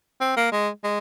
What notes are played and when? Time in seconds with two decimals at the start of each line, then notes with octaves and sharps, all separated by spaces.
0.20 C4
0.37 A#3
0.52 G#3
0.84 G#3